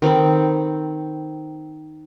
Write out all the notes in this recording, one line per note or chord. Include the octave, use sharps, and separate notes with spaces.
D#3 C4 A4 B5